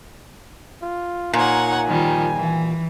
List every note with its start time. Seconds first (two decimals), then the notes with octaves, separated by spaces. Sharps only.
0.82 F4
1.33 A#2 D#4 C#5 F#5 G#5
1.88 D#3 F3 G3
2.35 E3